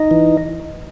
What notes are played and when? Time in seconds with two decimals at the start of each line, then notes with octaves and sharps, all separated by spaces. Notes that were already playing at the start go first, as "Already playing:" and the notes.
Already playing: D#4 D#5
0.11 E3